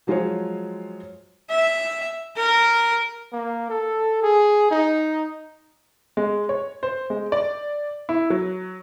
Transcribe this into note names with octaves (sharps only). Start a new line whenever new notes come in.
F3 F#3 G#3 F4 C5 C#5
E5
A#4
A#3
A4
G#4
D#4
G#3
C#5
C5
G#3
D5
E4
F#3